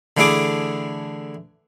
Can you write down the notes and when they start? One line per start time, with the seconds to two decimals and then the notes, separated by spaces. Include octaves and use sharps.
0.17 D3 E3 A3 E4 G#4 D6